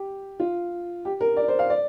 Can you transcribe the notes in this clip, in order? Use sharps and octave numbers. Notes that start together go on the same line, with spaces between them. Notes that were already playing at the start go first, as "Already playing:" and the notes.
Already playing: G4
F4
G4
A#4
D5
C5
F5
D5